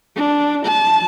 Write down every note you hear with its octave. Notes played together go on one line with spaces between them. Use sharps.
D4
A5